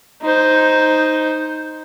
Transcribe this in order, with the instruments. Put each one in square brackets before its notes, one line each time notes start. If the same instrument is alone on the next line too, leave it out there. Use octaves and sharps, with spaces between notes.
[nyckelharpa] D#4 C5